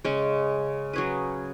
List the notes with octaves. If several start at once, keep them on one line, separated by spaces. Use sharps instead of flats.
C#3 G#3 C#4
F#3 C#4 G#4 B4